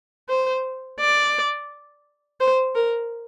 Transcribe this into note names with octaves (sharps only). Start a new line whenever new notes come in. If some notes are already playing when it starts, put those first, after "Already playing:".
C5
D5
C5
A#4